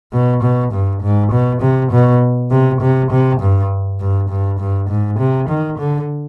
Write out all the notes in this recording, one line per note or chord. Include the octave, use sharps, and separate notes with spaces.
B2
B2
G2
G#2
B2
C3
B2
C3
C3
C3
G2
G2
G2
G2
G#2
C3
D#3
D3